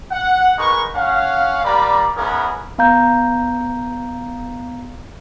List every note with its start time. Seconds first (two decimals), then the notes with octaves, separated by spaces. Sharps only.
0.12 F#5
0.58 G#3 D#4 A#4 B4 C#6
0.95 C#4 F5 F#5
1.64 G3 A#3 D5 A#5 B5
2.16 B3 C#4 D#4 E4 G#4 A#4
2.78 B3 F5 A#5 G6